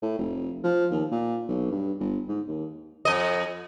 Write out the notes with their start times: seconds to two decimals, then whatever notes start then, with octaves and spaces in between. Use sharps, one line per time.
0.02 A2
0.18 F1
0.64 F3
0.91 D#2
1.11 A#2
1.49 B1
1.72 G2
2.00 G1
2.28 G#2
2.48 D#2
3.05 F2 D#5